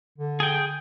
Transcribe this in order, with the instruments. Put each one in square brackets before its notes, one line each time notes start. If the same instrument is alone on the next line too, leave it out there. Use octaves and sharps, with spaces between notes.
[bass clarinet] D3
[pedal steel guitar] G#4 G5